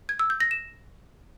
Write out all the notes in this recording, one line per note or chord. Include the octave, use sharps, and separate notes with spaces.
G#6
E6
G6
A#6
E7